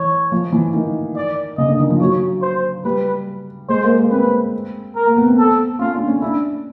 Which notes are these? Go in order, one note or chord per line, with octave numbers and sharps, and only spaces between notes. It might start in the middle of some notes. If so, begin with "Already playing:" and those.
Already playing: E3 C#5
F3
E3
D#3
D5
C#3 D#5
D3
D#3
F3
F#3 C#5
C5
G3 B4
G#3 C5
A#3
A#3
C4 B4
A#4
A#3
B3
C4
A4
C#4 F4
D4
C#4
D4 E4